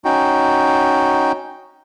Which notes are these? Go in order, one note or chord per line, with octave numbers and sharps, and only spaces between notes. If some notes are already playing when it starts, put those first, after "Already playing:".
C#4 D#4 F#4 G5